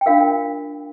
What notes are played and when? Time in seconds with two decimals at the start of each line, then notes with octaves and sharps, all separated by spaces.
0.01 G5
0.06 D4 F4 A#4 F5